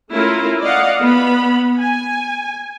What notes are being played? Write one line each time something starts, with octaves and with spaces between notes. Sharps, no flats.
A3 C#4 E4 F4 A#4
D5 D#5 F5 F#5
B3 B5
G#5